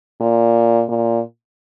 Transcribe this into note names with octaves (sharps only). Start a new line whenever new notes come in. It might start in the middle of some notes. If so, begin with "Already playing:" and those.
A#2
A#2